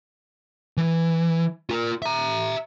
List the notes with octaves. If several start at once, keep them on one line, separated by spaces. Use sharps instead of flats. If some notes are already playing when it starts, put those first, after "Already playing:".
E3
F4 A#4
E5 A#5